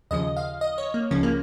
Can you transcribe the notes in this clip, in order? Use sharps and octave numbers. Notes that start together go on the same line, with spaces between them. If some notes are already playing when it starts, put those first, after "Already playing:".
D#2 C#3 F3 D#5
F5
D#5
C#5
A#3
C#2 C#3 F3 C#4
A#3